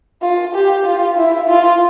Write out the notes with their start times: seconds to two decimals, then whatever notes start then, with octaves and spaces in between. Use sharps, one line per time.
0.23 F4
0.55 G4
0.86 F4
1.18 E4
1.48 F4